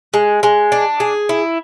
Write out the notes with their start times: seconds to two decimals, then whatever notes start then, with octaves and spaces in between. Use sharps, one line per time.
0.14 G#3
0.43 G#3
0.72 D4
1.00 G#4
1.29 E4